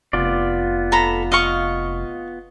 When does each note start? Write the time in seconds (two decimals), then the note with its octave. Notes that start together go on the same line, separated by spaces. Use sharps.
0.13 F1 B3 F4 D5
0.92 A4 A#5 B5
1.32 D#5 F5 C#6